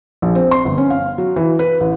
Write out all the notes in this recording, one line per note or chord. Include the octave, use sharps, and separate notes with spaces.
A#1
C4
C6
G1
C#4
F5
F#3
E3
B4
A1